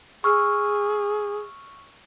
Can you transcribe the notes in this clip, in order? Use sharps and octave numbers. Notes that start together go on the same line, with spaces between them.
G#4 C#6 E6 F6